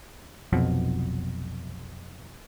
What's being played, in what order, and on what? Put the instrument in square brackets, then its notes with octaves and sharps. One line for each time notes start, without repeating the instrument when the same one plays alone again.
[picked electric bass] F1 B1 F2 B2